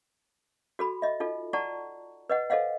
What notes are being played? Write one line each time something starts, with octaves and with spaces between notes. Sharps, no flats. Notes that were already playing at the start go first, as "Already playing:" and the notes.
F#4 A4 B5
D#5 E5
D#4 F4 A4
D5 F#5 A5 A#5 C#6
B4 D#5 F#5
A4 C5 D#5 F5 F#5